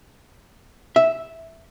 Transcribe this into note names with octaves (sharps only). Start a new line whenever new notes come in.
E5